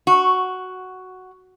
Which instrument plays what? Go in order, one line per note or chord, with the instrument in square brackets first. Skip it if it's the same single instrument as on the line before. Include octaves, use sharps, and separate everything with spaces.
[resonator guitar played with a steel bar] F#4